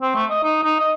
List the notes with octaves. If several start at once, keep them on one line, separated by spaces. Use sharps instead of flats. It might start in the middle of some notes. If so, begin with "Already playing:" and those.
C4
A3
D#5
D#4
D#4
D#5